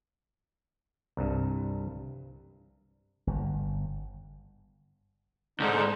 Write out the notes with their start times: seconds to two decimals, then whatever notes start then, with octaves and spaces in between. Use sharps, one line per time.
1.17 C2 G2
3.27 G1
5.60 C#2 G#2 D3 D#4